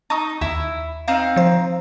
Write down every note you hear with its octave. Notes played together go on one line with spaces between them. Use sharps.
D#4 A5 C#6 D#6
D#2 E4
C4 D#4 F5
F3 C5